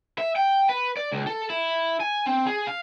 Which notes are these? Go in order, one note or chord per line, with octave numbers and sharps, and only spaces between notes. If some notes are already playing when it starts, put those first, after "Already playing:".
E5
G5
B4
D5
C#2
A4
E4
G#5
C4
G#4
F5